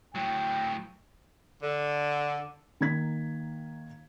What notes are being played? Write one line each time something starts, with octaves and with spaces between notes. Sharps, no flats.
A2 F#3 G5
D3
D#3 A#3 G#6 B6